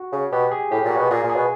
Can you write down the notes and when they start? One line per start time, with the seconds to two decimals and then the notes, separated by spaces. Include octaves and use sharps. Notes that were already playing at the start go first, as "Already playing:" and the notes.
Already playing: F#4
0.12 C#3
0.32 B2 G4
0.51 G#4
0.71 A2 G4
0.85 A#2
0.91 F#4
0.97 B2
1.10 A#2 G#4
1.24 A#2
1.29 G#4
1.36 B2